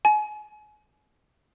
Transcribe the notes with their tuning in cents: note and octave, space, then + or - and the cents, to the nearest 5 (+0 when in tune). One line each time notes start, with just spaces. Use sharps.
G#5 +30